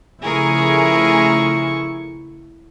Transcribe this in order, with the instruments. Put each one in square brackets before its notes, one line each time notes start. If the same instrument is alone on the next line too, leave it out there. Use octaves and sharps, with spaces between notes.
[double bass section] C#3 F3 A3 [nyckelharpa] E4 C#6 [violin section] G#4 A#4 G#5